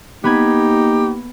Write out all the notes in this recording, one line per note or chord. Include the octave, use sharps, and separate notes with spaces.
A#3 B3 D#4 G4 B5 G#6